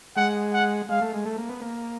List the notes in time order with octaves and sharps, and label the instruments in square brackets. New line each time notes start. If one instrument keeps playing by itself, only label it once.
[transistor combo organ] G#3 [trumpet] F#5
[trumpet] F#5
[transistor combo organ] G#3 [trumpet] F5
[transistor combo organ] A3
G#3
A3
A#3
B3
A#3